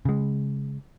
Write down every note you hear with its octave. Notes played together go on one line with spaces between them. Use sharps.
C#3 G#3